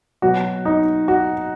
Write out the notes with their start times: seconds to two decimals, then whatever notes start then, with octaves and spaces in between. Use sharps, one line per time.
0.22 B2 F#3 F#4
0.65 D#4
1.08 F#4